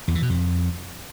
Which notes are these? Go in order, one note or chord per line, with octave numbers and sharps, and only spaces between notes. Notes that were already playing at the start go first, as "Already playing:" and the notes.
E2
E3
B2
F2